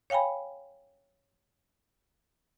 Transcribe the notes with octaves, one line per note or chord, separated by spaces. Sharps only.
C#5 F5 G5 G#5 B5